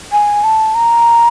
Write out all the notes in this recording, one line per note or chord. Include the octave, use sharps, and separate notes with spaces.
G#5
A5
A#5